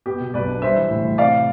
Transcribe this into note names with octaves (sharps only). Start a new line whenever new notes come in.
B3 G4
B2
B1 B4 D5
D4
G3 C5 E5
E3
A2
A2
C3 D5 F5